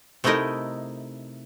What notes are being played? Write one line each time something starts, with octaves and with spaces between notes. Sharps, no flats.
C3 A3 D#4 E4 A#4 D#5